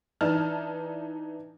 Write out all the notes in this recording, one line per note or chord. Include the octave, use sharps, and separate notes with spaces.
E3 D4 D#4 A5 F6